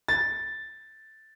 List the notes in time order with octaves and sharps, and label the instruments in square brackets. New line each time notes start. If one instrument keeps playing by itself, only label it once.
[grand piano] A6